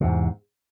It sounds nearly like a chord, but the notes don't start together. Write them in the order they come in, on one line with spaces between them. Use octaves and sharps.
C3 E2 G#2